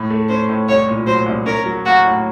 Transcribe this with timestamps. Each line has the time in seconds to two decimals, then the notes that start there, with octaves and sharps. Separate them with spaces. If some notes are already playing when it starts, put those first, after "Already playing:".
Already playing: A2
0.10 A3
0.29 C#4 C5
0.49 A2
0.68 C2 C#5
0.88 A#2
1.07 F#3 C5
1.26 C2
1.46 C#4 A#4
1.66 F#3
1.86 A#3 F#4
2.05 A2